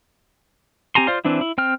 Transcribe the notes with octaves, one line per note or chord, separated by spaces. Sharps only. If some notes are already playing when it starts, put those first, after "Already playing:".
C4 G4 G#5 A#5 C6
F4 C5 D5 F5 C6
E3 C4 D4 E4
E4
C4 G5 F6